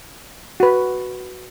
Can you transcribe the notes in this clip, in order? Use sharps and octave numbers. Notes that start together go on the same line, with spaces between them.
F#4 B4